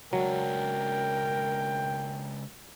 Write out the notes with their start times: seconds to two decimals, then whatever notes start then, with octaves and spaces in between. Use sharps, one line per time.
0.13 C#3 F#3 G#3 D4 A#4 G5